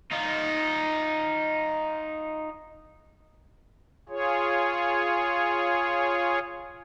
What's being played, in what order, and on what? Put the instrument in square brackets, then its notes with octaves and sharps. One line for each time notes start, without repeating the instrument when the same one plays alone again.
[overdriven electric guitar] D#4 F4
[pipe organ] F4 G#4 C#5